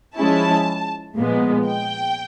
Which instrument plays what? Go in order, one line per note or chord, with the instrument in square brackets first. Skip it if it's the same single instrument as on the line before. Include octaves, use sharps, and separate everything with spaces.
[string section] F3 G#3 C#4 E4 A5
A#2 F3 G#3 B3
G5